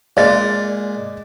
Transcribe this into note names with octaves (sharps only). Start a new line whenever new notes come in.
A#2 G#3 D5 A6